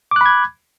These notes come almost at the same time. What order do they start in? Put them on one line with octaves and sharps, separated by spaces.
D6 F#6 B5 G#6